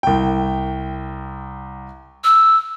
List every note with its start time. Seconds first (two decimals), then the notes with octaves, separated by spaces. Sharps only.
0.03 C2 G5
2.24 E6